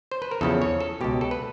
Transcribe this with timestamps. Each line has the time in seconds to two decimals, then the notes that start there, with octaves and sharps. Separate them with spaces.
0.12 C5
0.22 B4
0.31 A#4
0.41 E2 C#3 F3 A4
0.62 C#5
0.81 A4
1.01 C#2 B2 G4
1.21 A4
1.31 B4